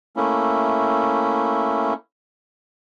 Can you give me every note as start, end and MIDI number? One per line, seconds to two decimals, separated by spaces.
0.16 1.94 57
0.16 1.94 58
0.16 1.94 61
0.16 1.94 64